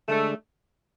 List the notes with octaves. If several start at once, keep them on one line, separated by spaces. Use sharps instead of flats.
D3 G#3 A3 D4 A4